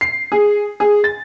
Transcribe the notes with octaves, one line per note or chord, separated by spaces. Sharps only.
C7
G#4
G#4
A6